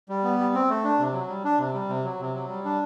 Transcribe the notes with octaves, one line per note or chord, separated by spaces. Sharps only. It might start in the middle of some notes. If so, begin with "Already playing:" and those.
G3
B3
G3
C4
A3
D4
C3
F#3
G3
D4
C3
G3
C3
F#3
C3
F#3
G3
D4